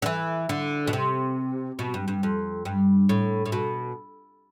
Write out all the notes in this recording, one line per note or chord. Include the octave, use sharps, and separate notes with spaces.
D3
E3
D3
B2
C3
B2
G2
G2
F2
G2
A2
A2
B2